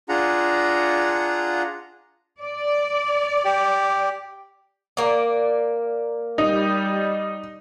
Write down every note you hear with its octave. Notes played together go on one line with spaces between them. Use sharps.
D4 F4 G#4 F#5 A#5
D5
G4
A#3 D5
G3 D#4